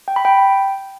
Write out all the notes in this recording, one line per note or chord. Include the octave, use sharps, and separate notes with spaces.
G5
B5
G5